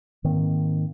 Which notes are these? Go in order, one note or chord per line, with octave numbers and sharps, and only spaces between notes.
G#2 D#3 A#3 C4